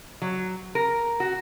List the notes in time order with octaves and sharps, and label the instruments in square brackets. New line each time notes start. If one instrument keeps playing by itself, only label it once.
[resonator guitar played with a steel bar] F#3
A#4
F#4